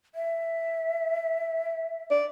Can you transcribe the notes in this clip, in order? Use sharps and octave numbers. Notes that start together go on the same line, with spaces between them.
E5
D5